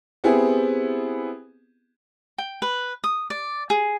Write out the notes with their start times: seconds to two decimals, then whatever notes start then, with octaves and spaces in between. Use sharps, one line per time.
0.24 B3 C4 E4 G4 G#4
2.38 G5
2.62 B4
3.04 D#6
3.30 D5
3.70 G#4